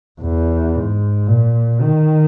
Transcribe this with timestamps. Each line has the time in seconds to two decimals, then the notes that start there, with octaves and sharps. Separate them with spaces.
0.21 E2
0.74 G#2
1.27 A#2
1.81 D#3